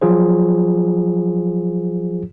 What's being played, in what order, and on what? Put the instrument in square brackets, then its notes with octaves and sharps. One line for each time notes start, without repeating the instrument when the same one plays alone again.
[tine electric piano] F3 F#3 F4 G#4 C5